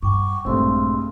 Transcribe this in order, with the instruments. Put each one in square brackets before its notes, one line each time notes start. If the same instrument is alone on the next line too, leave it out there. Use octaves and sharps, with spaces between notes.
[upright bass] G2 [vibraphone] F#5 G5 D6 [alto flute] C#6
[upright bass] A#1 [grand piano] G2 A3 C4 [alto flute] G#3 [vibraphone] C6 E6